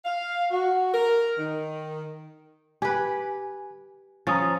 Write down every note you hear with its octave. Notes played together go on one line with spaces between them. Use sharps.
F5
F#4
A#4
D#3
G4 B4 G#5
F3 C#4 A#5 D#6 A6